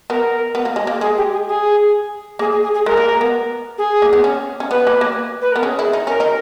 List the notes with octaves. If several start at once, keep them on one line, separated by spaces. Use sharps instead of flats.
B3 A#4
B3
A#3
G#3
A#3
G#3 G#4
G4
G#4
G#4
A#3 G#4
G#4
G#4
G#4
G#3 A#4
A#3
A#3
B3
G#4
A#3
B3
C#4
C#4
B3 B4
A#3
A#3
B4
B3 A#4
C#4 G#4
E4
D#4
C#4 A#4
D#4